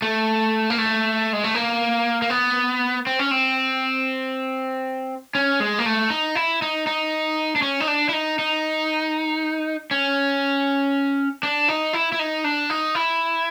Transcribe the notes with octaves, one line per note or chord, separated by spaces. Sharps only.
A3
A#3
A3
G#3
A3
A#3
A#3
B3
C4
C#4
C4
C#4
G#3
A#3
A3
D#4
E4
D#4
D#4
D4
C#4
D#4
D4
E4
D#4
D#4
C#4
D4
D#4
E4
E4
D#4
D4
D#4
E4